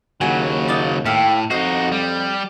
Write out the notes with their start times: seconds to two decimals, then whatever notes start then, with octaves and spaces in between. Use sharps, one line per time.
0.21 D#2 C#3 F#3 F#5 G#5
0.68 D#4 F4 D5
1.06 A2 G4 E5 F5
1.51 F2 D#4 F#4 C5 D#5
1.92 G3